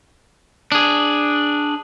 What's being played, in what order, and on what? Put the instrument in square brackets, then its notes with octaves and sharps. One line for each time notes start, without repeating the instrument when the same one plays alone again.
[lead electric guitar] D4 G#4